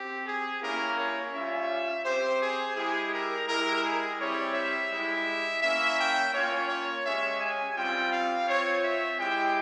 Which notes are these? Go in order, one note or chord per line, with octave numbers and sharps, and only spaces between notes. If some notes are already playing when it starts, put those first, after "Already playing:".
Already playing: C4 G4
G#4
A#3 C#4 E4 G4 A#4
C#5
G3 C#4 F4 E5
C4 G4 C5
G#4
G#3 E4 G4 G#4
A#4
G#3 E4 G4 A#4
G#4
G3 C4 E4 G4 C#5
E5
G#3 E4 G4
A#3 C#4 E4 E5
G5
A#3 C#4 F4 C#5
C#5
G#3 C#4 G4 E5
G#5
G3 C4 F4 G5
F5
C4 F4 C#5
E5
G#3 E4 G4 G5